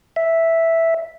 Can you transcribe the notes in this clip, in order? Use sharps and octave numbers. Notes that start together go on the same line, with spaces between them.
E5